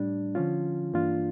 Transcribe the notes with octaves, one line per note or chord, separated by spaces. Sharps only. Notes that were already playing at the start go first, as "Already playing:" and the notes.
Already playing: A2 G3 D4
D3 F3 C#4 F4
G2 E3 A#3 D4 F4